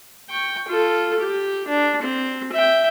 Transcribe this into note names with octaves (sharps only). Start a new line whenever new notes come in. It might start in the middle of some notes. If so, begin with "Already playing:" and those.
G5 C#6
F4 A4
G4
D4
C4
E5 G5